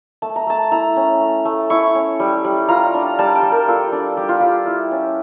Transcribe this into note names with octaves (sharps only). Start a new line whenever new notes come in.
A3 A5
A#5
A3 A5
E4 A#5
C#4
A3
A3
E4 C#6
C#4
G3
G3
F4 A#5
D4
G3 A5
G5
G3
A#4
F4 A4
D4
G3 G4
F4
G3 G4
E4
C#4